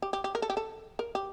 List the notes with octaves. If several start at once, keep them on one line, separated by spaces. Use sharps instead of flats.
G4
G4
G4
A#4
A4
G4
A4
A#4
G4